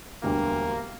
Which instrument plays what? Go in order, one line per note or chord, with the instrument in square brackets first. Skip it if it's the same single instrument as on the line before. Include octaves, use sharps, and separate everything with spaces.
[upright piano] E1 D2 D3 G3 [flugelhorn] A#3